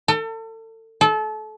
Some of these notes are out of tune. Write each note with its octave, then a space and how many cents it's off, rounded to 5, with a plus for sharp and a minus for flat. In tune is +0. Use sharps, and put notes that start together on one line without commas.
A4 +35
A4 -30